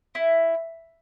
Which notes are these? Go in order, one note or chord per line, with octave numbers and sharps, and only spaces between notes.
E4